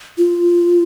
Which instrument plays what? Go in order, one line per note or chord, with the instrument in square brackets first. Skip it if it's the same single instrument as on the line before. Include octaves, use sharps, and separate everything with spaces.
[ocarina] F4